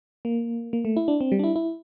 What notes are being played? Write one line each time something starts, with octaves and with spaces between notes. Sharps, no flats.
A#3
A#3
A3
E4
D4
C4
G3
D4
E4
E4